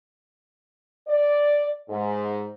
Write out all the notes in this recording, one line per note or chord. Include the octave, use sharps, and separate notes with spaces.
D5
G#2